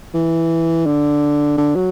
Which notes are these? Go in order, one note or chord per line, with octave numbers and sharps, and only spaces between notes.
E3
D3
D3
F#3